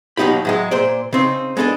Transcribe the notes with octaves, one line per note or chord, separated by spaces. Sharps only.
D#2 B2 F#3 D#4 G4 B5
A2 F#3 G#3
A#2 C5 D5
C#3 C4 D#4
G#3 B3 D4 A4 D#5